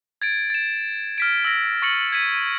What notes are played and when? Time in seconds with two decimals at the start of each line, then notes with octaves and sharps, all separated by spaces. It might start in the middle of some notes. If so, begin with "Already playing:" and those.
0.22 G#6 A6 D7
0.50 A6 E7
1.18 F6 B6 D7
1.45 E6 A#6
1.82 C#6 A6 C#7 F#7
2.12 G#6 B6 D#7